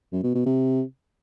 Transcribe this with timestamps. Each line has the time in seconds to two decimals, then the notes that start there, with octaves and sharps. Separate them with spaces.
0.12 F#2
0.23 B2
0.35 B2
0.46 C3